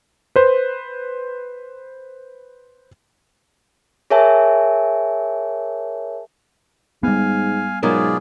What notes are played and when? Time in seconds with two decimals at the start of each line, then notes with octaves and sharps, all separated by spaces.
0.36 B4 C5
4.10 G#4 A#4 C#5 E5 G#5 A5
7.03 G#2 G3 B3 F5 G#5
7.83 G#2 B2 F#3 F4 G#4 A#4 D5